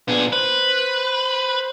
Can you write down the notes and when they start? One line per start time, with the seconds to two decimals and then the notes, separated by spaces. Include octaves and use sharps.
0.08 A#2 B3 D4 G#4
0.33 B4 C5